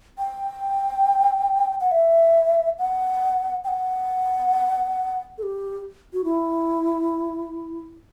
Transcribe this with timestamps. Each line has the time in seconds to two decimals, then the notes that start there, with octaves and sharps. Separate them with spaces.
0.19 G5
1.81 F#5
1.91 E5
2.79 F#5
3.64 G5
3.68 F#5
5.38 A4
5.43 G4
6.13 F#4
6.24 E4